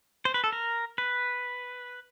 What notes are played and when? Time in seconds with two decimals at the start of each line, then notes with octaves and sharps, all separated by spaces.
0.25 C5
0.34 B4
0.44 A4
0.52 A#4
0.98 B4